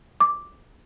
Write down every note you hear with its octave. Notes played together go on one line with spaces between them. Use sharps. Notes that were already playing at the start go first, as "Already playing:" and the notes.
D6